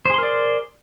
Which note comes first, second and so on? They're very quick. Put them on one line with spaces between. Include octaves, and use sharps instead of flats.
C5 G#4 C6 A#4 D5